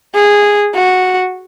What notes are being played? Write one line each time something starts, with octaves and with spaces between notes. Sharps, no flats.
G#4
F#4